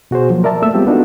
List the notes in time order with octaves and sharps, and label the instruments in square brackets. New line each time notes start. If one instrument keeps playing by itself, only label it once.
[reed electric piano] B2 F#4 G#4 C5
F3 F#3 A#3
A#4 D5 E5 A5
A3 A#3 E5 E6
G3 G#3 B3 C4 F4 G4
B3 D4 D#4 F4 F#4 A4